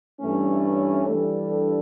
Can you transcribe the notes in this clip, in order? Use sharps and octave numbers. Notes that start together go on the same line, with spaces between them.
G2 E3 A3 C#4
G2 E3 G3 D4 A4